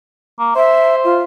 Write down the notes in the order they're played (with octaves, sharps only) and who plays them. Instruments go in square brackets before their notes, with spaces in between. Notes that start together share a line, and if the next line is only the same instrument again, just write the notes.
[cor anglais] A#3
[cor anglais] C5 [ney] E5
[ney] F4